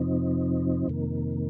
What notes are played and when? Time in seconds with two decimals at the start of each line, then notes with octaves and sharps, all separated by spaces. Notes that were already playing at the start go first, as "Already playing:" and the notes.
Already playing: F2 C3 F3 C4 D#4
0.88 F2 C3 D#3 A#3